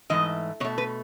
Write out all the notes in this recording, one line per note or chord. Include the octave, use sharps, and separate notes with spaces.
G#2 E3 A3 D#5
B2 A3 C#5
B4